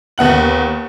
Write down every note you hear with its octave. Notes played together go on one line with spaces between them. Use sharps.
D#2 B3 F#5 F#7